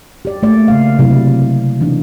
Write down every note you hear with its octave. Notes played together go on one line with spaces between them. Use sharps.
G4 D5
A3 A#3 D5
C#3 A#3 F5
C3 F#3 E4
E3 B3 D4 D#4